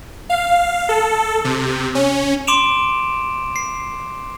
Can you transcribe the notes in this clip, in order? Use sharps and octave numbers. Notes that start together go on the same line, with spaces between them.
F5
A4
C3
C#4
C6 D6 D7 E7 F7
C7